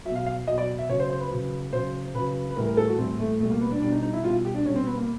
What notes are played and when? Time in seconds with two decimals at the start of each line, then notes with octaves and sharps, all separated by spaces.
0.05 F#3 E5
0.10 B2
0.16 F5
0.26 F5
0.47 F#3 D#5
0.51 B2
0.58 D5
0.79 E5
0.89 C#3 F#3 C#5
1.00 C5
1.10 C5
1.20 B4
1.31 C#3 F#3
1.73 C#3 F#3 C5
2.15 C#3 F#3 B4
2.51 B4
2.56 A2 E3 G3 A#4
2.67 A#4
2.77 A4
2.88 F#4
2.98 A2 E3 G3 C4
3.19 A3
3.40 B2 A3
3.44 G3
3.50 A#3
3.61 B3
3.71 D4
3.82 B2 G3 D4
3.92 D#4
4.03 D#4
4.13 E4
4.23 B2 G3 F4
4.45 G4
4.54 D4
4.65 B2 C#4
4.70 G3
4.76 C4
4.87 B3
4.97 A#3